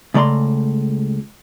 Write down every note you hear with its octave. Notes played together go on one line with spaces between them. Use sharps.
C#2 C#3 A3 D5 A#5 C6